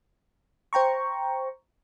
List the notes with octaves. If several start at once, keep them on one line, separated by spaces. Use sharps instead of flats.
C5 G5 A#5 C#6